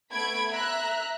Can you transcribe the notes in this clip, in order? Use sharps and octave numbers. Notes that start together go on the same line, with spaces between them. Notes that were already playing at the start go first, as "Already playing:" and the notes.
A3 B3 B5 G#6 D7
E5 A#5 F#6